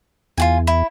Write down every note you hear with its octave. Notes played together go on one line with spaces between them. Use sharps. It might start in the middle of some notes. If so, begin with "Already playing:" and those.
E2 F4 F#4 G#5
E4